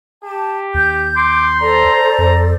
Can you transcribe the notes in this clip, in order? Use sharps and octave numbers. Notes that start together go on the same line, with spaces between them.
G4 A5
D#2 G6
C6 D6
A4 C5 D5 A#5
F2